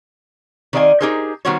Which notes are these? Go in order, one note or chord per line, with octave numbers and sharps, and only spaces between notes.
D#3 C4 D5 D#5 F5 G#5
D#4 G4 G#4 A#4 C5
D#3 G3 B3 F#4 C5 C#5